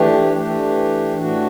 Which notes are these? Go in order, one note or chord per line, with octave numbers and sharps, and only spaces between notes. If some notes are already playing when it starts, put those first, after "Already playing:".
Already playing: E3 A3 D4 G4
E3 A3 D4 G4
A2 E3 A3 D4 F#4